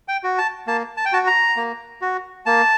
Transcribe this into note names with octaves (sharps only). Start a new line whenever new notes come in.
G5
F#4
A5
A#3 A5
A5
G5
F#4 A5
A#5
A#3
F#4
A#3 A5